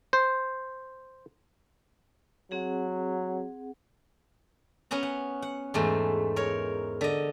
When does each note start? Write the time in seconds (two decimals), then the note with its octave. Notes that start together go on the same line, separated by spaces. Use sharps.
0.13 C5
2.51 F#3 C4 G#4 F#5
4.91 B3 C#4 F#5 A#5
5.03 F#5
5.42 F#5
5.74 E2 G#2 A3
6.36 A#4 C#5
7.01 D3 D#5